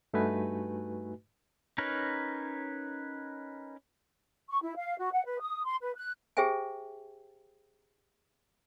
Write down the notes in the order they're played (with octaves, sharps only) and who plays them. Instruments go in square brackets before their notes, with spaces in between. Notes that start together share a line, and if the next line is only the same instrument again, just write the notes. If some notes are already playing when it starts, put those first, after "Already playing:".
[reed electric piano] G2 A3 D#4 F#4 B4 G#5
[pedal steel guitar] C#4 D#4 A#4 B4 C#5
[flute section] C#6
E4
F5
F#4
F#5
B4
D#6
C6
B4
F#6
[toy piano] G4 G#4 C5 E5 G5 G#5